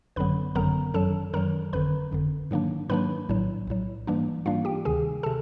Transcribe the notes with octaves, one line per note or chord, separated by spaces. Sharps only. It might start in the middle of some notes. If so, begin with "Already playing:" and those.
G#1 F#2 D3 F#3 B3 B4 B5
G#1 F#2 D3 F#3 B3 A#4 A#5
F#2 D#3 F#3 A4 A5
F#2 D#3 F#3 A#4 A#5
G1 F2 D3 B4 B5
G1 F2 D3
G#2 D#3 F#3 A#3 D4
G#2 D#3 F#3 A#3 D4 B4 B5
A#1 A2 F#3
A#1 A2 F#3
G#2 E3 G3 A#3 D4
G#2 E3 G3 A#3 D4 F4 F5
G4 G5
D2 C3 D#3 G#4 G#5
C3 A4 A5